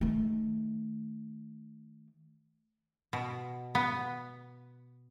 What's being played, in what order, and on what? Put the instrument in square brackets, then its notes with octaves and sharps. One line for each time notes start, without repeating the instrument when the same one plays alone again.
[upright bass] D#3 A3
[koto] B2
B3